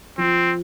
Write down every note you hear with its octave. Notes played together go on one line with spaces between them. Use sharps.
F3 C4